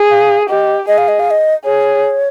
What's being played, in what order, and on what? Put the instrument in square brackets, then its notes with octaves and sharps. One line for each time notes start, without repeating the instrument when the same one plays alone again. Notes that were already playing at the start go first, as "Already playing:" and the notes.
Already playing: [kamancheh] G#4
[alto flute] F5
[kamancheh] G4 [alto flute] D#5
[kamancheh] G#4 [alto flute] D#5
[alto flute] F5
D#5
F5
D#5
[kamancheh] G#4 [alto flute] C#5